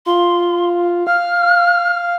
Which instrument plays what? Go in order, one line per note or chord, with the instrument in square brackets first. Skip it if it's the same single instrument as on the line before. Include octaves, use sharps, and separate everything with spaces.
[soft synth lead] F4 [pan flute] C6
[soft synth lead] F5 [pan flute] F6